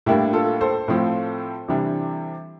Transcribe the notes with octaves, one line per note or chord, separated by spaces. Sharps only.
A2 G3 A#3 D4 E4 G4
F4 A4
A4 C5
A2 F3 C4
C3 E3 G3 D4